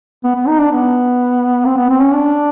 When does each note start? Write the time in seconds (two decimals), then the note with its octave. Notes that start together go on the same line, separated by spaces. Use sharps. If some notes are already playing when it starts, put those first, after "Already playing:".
0.24 B3
0.36 B3
0.48 D#4
0.59 D4
0.72 B3
1.66 C4
1.77 B3
1.90 C4
2.01 C#4
2.13 D4